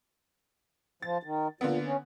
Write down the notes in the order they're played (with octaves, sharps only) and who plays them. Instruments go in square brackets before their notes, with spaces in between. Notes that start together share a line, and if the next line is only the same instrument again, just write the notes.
[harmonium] F3 [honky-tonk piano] A6
[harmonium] D#3
[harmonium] A#2 [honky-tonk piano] D3 A#3 B3
[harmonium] C#4